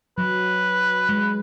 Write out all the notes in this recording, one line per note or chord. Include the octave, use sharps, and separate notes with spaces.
F#3 B4
G#3